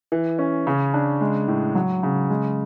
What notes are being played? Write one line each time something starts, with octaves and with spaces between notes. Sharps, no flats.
E3
C#4
C#3
D4
G#3
A2
F#3
C#3
G#3